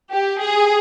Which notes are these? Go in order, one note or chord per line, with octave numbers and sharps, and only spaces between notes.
G4
G#4